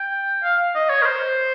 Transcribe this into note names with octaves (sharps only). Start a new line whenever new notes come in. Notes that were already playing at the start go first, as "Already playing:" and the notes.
Already playing: G5
F5
D#5
C#5
A#4
C5